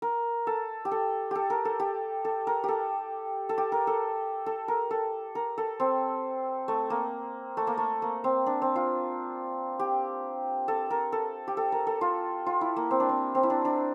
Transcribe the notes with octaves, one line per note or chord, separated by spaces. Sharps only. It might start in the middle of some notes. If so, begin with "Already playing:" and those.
A#4
A4
G4
A4
G4 A4
A#4
A4
G4
A4
A#4
G4 A4
A4
G4
A#4
A4
A4
A#4
A4
A#4
A4
C4
A3
A#3
A3
A#3
A3
A#3
C4
D4
C4
F4
G4
A4
A#4
A4
G4
A4
A#4
A4
F4
F4
E4
A#3
C4
D4
C4
C4
E4
D4
D4